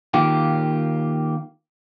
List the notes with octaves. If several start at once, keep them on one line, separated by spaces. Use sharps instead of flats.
D#3 A#3 F4 G4